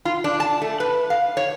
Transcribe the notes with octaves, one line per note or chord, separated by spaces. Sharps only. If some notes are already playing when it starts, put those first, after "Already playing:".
F4
D4
A5
A3
B4
F5
C#5